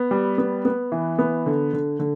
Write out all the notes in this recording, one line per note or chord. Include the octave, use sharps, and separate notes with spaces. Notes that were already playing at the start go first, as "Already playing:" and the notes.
Already playing: B3
G3
B3
B3
E3
B3
D3
D3
D3